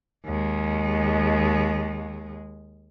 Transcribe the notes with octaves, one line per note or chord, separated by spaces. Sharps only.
D#2 G#3